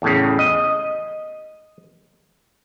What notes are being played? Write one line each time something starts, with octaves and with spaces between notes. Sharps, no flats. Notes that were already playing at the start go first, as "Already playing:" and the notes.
E2 A2 C#3
D#5